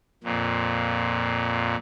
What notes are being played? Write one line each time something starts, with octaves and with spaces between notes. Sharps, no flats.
F2 A#2